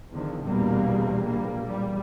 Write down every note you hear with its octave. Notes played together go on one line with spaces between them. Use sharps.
E2 D3 D#3 F3
A#1 E2 B2 G3 A#3
A#1 G3 A#3
E2 G3